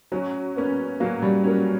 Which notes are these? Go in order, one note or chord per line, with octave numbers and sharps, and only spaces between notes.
F#3 C#4
A#3 B3 C#4
F#3 A#3
G3
F#3 A#3 C#4